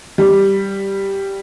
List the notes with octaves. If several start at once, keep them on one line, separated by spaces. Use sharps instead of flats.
G3